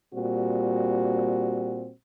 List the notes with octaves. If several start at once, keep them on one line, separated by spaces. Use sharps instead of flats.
A#2 G3 C4 F#4